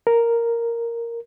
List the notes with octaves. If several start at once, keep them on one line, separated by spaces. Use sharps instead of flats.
A#4